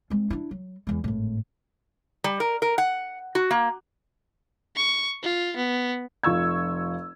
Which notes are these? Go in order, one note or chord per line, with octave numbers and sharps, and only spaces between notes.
G#3 C4
D4 E4
F#3
E2 G#3
G#1 A2
G3
A#4
A#4
F#5
F#4
A#3
C#6
F4
B3
F1 F4 C#6 E6 G#6